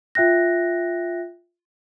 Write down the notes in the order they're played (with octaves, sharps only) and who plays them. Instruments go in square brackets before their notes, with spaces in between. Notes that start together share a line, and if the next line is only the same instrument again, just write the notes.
[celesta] F4 E5 G5 F#6 A#6